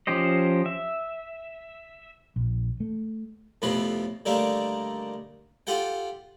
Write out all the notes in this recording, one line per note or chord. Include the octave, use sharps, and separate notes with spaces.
F3 C#4 G4 C5 D#5
E5
A#1
A3
F2 A2 C3 B3 C#4 B4
D3 D#3 G3 A3 A#3 D4
F4 G4 A4 F#5 G5